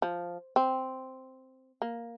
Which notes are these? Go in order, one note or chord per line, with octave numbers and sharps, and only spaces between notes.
F3
C4
A#3